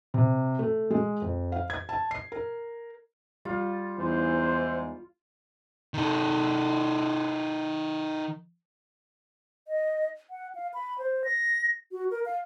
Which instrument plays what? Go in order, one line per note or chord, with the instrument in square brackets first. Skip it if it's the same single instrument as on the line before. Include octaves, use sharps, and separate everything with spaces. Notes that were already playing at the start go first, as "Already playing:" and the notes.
[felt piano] C3
A3
G#3
F2
F5
G#6
A5
C7
A#4
[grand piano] G3 [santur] F4
[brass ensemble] E2 G#2 [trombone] C5
[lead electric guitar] D#3 A4
[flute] D#5
F#5
F5
B5
C5
A#6
F#4
A#4
F5